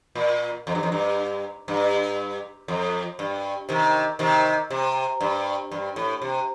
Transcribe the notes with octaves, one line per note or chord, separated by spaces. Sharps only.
A#2
F2
G2
F2
G2
G2
F2
G2
C3 D#3
C3 D#3
C3
G2
G2
A2
C3